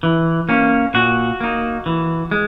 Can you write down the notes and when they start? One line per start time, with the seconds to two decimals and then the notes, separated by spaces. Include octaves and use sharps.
0.03 E3
0.49 A#3 C#4
0.94 A#2 F#4
1.41 A#3 D#4
1.86 E3
2.31 G#3